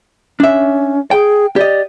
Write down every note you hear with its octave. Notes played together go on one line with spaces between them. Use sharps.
C#4 D4 E5
G#4 G5
G4 D5 D#5